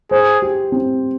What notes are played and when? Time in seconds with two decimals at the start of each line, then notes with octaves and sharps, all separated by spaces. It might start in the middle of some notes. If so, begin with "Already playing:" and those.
0.11 G#4 C5
0.42 G4
0.72 C4